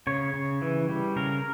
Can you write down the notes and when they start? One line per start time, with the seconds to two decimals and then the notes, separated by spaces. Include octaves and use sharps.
0.07 C#3 C#5
0.34 C#3
0.62 E3
0.89 G3
1.16 C#3 A#4